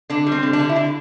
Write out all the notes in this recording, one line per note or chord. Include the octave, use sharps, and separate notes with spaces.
D3 D4
G3
C4
D3
D4
D3
E4
D3 D4